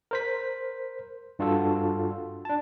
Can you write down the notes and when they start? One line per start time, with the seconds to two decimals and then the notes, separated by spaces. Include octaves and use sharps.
0.11 A#4 C5 B6
1.39 G2 D4 F4 F#4 A4
2.45 D4 A5